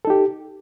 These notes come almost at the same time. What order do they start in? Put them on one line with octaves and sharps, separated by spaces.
A4 D#4 G4